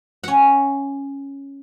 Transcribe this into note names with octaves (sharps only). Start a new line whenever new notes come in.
C#4 F#5